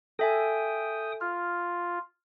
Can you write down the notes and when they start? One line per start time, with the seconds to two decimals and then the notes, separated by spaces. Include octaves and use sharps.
0.19 A4 E5 G5 G#5 D#6
1.21 F4 F6